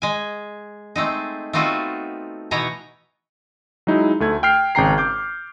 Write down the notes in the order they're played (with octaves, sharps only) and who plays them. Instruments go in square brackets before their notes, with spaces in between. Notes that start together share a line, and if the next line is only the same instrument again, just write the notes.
[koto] G#3 G#5
G#3 A3 C4 D#4
A3 B3 C4 D#4 F4 F#4
B2 E3 B3 D#4 C#5 A#5
[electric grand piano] F#3 G#3 D#4 E4
D2 A3 G#6
G5 F6 C7
G#1 C#3 G5 A#5 C7
D6 G6